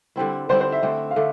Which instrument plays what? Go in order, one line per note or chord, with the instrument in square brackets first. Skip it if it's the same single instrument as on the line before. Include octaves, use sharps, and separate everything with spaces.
[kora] D3 G3 C4 E4
[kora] D3 G3 C4 E4 [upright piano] C5
[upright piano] C5
E5
[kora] D3 A3 C4
[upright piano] F5
[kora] D3 A3 [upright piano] E5